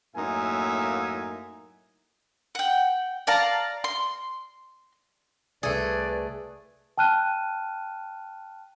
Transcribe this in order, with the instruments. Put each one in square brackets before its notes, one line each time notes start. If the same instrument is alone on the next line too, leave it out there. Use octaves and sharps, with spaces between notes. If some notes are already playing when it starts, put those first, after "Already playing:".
[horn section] F#2 A2 A#3 D#4 E5 G#5
[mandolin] F#5 G5
D5 F5 A5 A#5
C6
[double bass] C2 [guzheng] A3 G#4 [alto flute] B4 [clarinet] D5
[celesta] G5 A5 F6 F#6 D#7